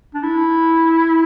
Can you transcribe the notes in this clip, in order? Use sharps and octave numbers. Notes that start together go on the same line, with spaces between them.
D4
E4